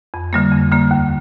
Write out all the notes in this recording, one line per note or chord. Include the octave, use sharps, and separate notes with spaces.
F2
D3 G3 A#3
F2
D3 G3 A#3
D#2